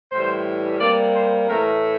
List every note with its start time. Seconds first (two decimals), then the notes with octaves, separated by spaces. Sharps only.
0.12 A2 E3 G3 C5
0.79 C3 G3 A#3 D5
1.13 C5
1.47 A2 E3 A3 A#4